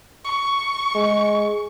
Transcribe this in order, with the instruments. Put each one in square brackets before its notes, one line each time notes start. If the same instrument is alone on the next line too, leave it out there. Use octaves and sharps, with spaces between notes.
[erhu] C#6
[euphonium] G#3